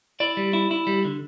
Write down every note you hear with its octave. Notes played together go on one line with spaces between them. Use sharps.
E4 D5
G3
E4
E4
G3
D3